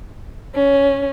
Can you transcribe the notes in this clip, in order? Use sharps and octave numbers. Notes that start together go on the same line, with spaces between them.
C#4